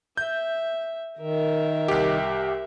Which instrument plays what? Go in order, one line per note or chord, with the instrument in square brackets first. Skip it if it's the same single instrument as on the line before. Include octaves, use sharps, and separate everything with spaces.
[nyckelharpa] E5 [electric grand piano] G6
[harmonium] D#3 [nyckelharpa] A#4 E5
[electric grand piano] C2 G4